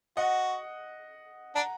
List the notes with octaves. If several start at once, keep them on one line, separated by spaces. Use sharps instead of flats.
F#4 D#5 F#5
D4 F#5 A#5